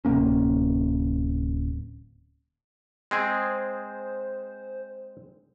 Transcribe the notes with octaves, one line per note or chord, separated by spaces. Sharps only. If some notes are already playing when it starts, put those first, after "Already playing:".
D1 C3 A#3 C#4
G#3 C4 G#4 C5